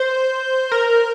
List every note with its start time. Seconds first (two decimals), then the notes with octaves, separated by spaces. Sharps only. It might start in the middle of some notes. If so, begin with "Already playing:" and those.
Already playing: C5
0.72 A#4